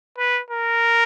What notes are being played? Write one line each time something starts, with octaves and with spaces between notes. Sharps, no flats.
B4
A#4